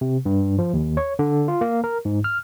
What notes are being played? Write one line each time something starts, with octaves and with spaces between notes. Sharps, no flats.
C3
G2
F3
D#2
C#5
D3
F4
A#3
A#4
G#2
F6